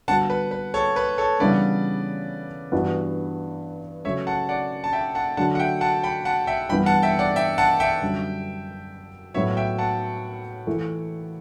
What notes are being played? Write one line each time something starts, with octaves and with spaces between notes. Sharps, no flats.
D3 G3 B3 F#4 F#5 A5
B4
B4
A4 C#5
B4
A4 C#5
C#3 E3 G3 B3 D4 B4 D5
G2 E3 B3 F#4
C#3 F#3 A3 C#4 C#5 E5
F#5 A5
D5 F#5
A5
E5 G5
F#5 A5
D3 F#3 A3 F#5 A5
F#5
E5 G5
F#5 A5
G5 B5
F#5 A5
E5 G5
G2 E3 G3 B3 G5 B5
F#5 A5
E5 G5
D5 F#5
E5 G5
F#5 A5
E5 G5
F#2 D3 G3 C#4
A2 F#3 B3 F#4 C#5 E5
E5 G5
F#5 A5
E3 A3 E4